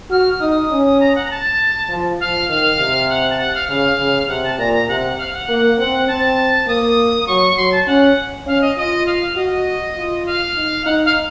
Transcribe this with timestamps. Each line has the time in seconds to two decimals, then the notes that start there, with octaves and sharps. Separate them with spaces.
0.11 F#4 F6
0.40 D#4 D#6
0.71 C#4
1.00 A#5
1.15 F#5
1.25 A#5
1.31 A5
1.90 F3
2.20 F3 F5
2.49 D#3 F5
2.79 C3
3.09 F#5
3.30 A5
3.39 F#5
3.55 F5
3.69 C#3 F5
3.99 C#3
4.29 C3 F#5
4.44 A5
4.58 A#2 A#5
4.73 A#5
4.88 C3 F#5
5.18 F5
5.33 F#5
5.49 A#3
5.77 C4 F#5
6.07 C4 A5
6.67 A#3 D#6
7.27 F#3 C#6
7.57 F#3 C6
7.72 A5
7.87 C#4 F#5
8.46 C#4 F5
8.61 D#5
8.77 F4 D#5
9.06 F5
9.36 F#4 D#5
9.96 F4
10.26 F5
10.56 D#4
10.85 D#4 F#5
11.05 F5